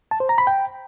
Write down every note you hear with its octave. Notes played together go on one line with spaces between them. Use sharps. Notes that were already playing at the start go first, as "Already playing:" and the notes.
A5
C5
A#5
B5
G5